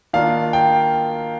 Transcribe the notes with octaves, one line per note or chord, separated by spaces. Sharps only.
D#3 A#3 D4 F4 F5
G5